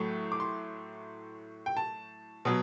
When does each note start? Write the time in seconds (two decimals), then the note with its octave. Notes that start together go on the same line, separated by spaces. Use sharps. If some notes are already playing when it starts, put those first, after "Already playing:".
Already playing: A2 F#3 A3
0.32 D6
0.40 C6
1.66 G5
1.77 A5
2.45 B2 F#3